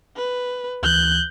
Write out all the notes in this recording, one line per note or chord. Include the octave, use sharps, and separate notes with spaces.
B4
D2 E3 F#6 G6